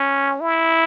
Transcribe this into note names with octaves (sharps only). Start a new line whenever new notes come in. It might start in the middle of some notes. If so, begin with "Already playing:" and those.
Already playing: C#4
E4